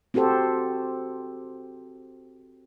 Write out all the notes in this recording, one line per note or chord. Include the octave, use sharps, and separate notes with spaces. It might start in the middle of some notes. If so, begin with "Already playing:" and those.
C4 F#4 G4 A4 C5